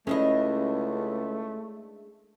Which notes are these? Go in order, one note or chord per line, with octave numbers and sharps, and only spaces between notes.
C#2 G#3 A3 C#4 D4 E4 D#5